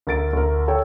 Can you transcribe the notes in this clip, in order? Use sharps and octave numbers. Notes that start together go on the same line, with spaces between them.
D2 A#4 A6 D7
D2 A#4
A4 C#5 G5 A5